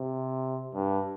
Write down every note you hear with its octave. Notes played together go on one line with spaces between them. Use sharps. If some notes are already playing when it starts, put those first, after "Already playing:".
Already playing: C3
G2